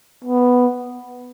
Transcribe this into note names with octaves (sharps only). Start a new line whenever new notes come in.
B3